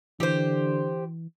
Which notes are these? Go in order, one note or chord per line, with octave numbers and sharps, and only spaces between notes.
D3 E3 G4 C5